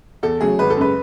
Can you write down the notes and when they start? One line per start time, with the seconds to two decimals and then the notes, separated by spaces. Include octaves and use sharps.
0.23 E2 A4
0.41 C#3 F#3 A3 G#4
0.59 G#1 B4
0.70 A4
0.77 F#2 C#3 G#3 B4